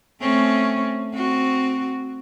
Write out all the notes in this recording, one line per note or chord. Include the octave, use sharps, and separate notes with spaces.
A3 C4 C#4
C4 F#4